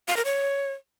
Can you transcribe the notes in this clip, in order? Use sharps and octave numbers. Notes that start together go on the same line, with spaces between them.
F5
A#4
C#5